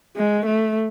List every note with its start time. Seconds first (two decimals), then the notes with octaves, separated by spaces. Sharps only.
0.17 G#3
0.46 A3